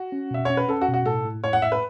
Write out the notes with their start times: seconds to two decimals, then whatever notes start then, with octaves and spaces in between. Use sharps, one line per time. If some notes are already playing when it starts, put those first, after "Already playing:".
Already playing: F#4
0.12 C#4
0.31 B2 E5
0.45 C#4 C#5
0.57 B4
0.68 C#4 A4
0.81 F#4
0.88 B2
0.94 F#4
1.06 A2 A4
1.25 A2
1.44 A2 C#5
1.53 F#5
1.62 A2 E5
1.72 B4